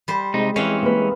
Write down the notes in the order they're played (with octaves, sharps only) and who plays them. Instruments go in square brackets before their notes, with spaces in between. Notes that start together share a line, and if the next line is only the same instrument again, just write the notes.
[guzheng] G3 C5
[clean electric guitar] C3 D#4 [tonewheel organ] G#3
[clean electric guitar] E3 C#4 [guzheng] C4 F5
[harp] A#3 B4